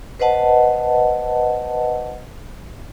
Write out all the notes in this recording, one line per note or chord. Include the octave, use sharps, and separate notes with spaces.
B4 C5 D#5 F#5 A5